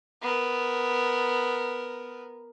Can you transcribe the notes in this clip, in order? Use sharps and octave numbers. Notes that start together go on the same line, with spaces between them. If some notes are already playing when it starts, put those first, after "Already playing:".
B3 A#4